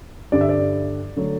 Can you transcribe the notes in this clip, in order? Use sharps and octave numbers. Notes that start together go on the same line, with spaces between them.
G2 D3 G3 D5
E5
D5
D3 F#3 A3